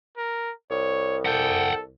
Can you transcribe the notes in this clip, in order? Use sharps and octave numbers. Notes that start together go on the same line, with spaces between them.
A#4
C2 C#5
A4 F#5 G5